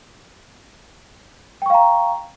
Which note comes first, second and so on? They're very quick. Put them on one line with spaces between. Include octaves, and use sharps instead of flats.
G5 C#6 F5 A#5